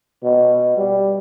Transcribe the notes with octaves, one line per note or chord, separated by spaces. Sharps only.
B2
G3